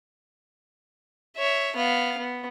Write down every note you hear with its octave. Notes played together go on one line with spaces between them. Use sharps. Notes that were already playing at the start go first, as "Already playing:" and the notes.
C#5 E5
B3 F5
B3